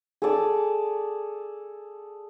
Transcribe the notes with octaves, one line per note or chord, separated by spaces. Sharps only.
G#4 A4 D5 A5